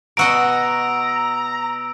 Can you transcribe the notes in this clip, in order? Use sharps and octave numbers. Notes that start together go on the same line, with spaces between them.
B2 F#4 D#5 A#5 E6 D7